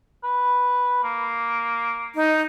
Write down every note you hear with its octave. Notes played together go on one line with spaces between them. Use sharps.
B4
A#3
D#4